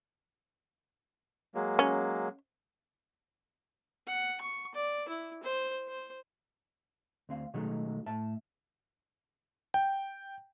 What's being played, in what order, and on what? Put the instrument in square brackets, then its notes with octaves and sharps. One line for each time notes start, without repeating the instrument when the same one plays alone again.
[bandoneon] F#3 G#3 A#3
[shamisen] C#4
[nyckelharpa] F#5
C#6
D5
E4
C5
C5
[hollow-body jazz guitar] D2 C4 F5
B2 D#3 F#3 G#3 A3 D#4
A2 E5 A5
[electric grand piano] G5